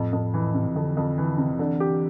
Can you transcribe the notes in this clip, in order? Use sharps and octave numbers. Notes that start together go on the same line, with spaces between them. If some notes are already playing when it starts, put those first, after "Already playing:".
Already playing: F2 A2
F2
E3
C3
F2 D3
F2
E3
C3
D3 E3
G4